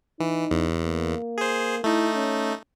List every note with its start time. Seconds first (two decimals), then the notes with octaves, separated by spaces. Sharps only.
0.20 E3 D#4
0.51 E2
0.84 A#3
1.38 G#4 C5
1.84 A3 D#4 E4
2.15 C#4